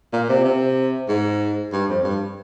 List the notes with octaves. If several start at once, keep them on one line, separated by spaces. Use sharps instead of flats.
A#2
C3
C3
G#2
G2
F2
G2